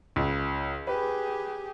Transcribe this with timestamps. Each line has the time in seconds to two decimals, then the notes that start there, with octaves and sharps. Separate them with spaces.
0.16 C#2
0.87 G4 G#4 B4